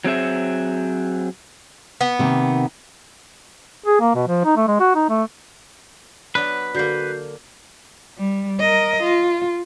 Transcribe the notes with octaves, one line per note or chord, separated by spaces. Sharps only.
F#3 C4 G#4 E5
B3
C3 D#3 A#3
G#4
A#3
B2
F3
D#4
A3
G#3
F#4
D#4
A3
F#3 B3 D4 B4
D3 A#3 F#4 G6 C7
G3
A#4 D#5
F4